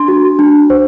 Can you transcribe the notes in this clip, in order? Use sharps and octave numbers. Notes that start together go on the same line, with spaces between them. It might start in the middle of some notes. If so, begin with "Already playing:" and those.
Already playing: D4 C6
F#4
D4
C5